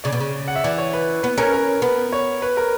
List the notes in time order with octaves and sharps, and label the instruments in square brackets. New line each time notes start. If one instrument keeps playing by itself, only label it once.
[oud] C#3 [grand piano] D5
[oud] B2
C#3
[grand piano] F#5
E5
[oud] E3 [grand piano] D5
[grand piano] C#5
B4
[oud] B3 [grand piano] B4
[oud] C#4 [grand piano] A#4
[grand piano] A#4
[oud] B3
[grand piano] C#5
B4
A#4